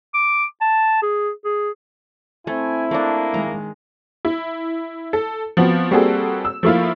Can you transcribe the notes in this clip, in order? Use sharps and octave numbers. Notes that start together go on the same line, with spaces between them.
D6
A5
G#4
G#4
A3 C4 E4 G#5
A3 A#3 D4
D#3 G#3 A#5
E4
A4
F3 B3 C4 F#4
G3 A#3 C4 F#4 G#4 A4
E6
F3 A3 A#3 E4 F4